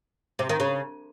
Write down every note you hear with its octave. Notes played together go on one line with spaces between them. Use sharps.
C3
D#3
C#3